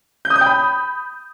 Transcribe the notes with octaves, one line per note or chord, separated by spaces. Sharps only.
G6
D#6
G6
G5
B5